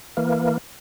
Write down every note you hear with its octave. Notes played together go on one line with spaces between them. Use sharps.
E3 A#3